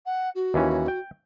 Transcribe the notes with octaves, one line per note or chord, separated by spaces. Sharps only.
F#5
F#4
D#2 E3 C#4
G5